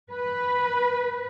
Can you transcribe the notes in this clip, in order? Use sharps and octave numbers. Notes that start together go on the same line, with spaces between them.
B4